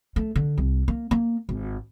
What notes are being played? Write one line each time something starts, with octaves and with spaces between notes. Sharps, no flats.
A3
D3
C2
A#3
A#3
G#1